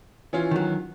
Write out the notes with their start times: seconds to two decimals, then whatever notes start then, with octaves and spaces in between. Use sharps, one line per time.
0.33 E3 C#4 F4
0.51 D#3 F#3